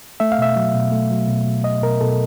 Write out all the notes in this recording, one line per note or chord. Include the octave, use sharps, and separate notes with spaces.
A3 E5
F5
B2 E5
F#3
B2
A3
F#3
B2
B2
B2 D#5
B2 A#4
B2 A4